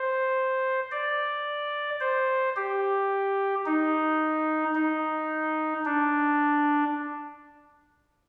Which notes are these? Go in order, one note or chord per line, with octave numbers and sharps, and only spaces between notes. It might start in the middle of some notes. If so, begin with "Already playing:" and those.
Already playing: C5
D5
C5
G4
D#4
D#4
D4